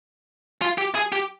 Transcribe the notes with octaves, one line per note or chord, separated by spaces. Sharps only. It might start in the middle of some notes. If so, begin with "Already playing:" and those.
F4
G4
G#4
G4